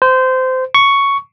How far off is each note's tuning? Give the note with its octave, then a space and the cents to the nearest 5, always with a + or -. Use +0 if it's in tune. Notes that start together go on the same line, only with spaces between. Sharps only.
C5 -20
C#6 +5